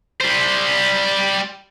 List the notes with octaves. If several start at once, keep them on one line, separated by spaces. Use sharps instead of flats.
G3 C5